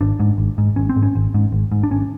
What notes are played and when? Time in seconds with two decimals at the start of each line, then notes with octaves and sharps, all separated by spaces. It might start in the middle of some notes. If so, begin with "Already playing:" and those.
0.01 G#1 D4
0.20 G#2
0.38 G#1
0.58 G#2
0.76 G#1 C#4
0.89 C4
0.96 G#2
1.03 C#4
1.15 G#1
1.34 G#2
1.52 G#1
1.72 G#2
1.84 D4
1.91 G#1 C#4